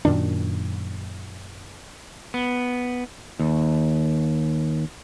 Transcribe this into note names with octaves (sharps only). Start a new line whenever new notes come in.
F#2 A#2 D#3 D4
B3
D#2